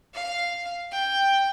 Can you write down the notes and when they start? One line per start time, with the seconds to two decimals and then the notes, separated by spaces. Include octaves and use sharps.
0.13 F5
0.91 G5